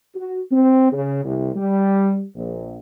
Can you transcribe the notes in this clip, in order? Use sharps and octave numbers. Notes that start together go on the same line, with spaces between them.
F#4
C4
C#3
C2
G3
A#1